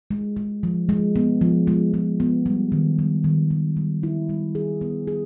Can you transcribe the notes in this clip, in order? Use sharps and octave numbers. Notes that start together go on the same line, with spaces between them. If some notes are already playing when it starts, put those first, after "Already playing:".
G#3
G#3
F3
G#3
B3
F3
G#3
G#3
B3
G3
D#3
G3
D#3
D#3
G3
E4
G3
G#4
B3
G#4